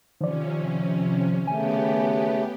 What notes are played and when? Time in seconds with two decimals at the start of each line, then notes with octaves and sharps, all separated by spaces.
0.21 C3 D#3 F3 C#4 D5
1.47 C#3 A3 B3 G4 G#5